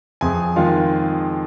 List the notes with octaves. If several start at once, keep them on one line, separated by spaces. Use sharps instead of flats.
F2 G#4 G#5
D#3 G#3 F4 F5